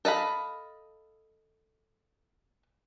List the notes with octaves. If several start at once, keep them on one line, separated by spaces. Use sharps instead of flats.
A4 D#5 F5 B5